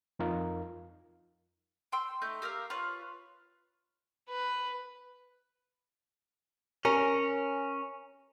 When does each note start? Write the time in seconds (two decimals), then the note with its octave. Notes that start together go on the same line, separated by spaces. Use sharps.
0.19 F2 D#4 F4 A#4 F5
1.92 G5 C6 E6
2.22 A3 D#4 G6
2.42 G4 A#4 E5 F5
2.70 F4 B4 C#5
4.29 B4
6.85 C#4 A#4